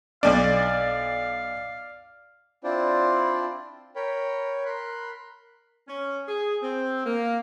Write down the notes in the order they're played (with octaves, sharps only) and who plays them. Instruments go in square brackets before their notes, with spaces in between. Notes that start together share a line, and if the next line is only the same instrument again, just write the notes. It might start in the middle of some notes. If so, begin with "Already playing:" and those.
[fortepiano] B1 D4 [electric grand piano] D5 [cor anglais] F5
[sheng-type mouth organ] C4 D4 E4 F4 C5 D5
A#4 C#5 G5 B5
A#4 B5 C6 F#6
[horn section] C#4
G#4
C4
A#3